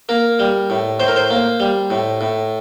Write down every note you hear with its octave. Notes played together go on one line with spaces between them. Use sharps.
A#3 A#4
G3
A2
A2 C5
A#4
C5
A#3
G3
A2
A2